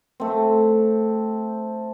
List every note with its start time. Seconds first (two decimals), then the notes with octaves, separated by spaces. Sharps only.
0.20 A3 C4